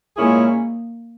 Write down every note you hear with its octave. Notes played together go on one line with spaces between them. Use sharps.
A#2 G#3 A#3 C#4 E4 G#4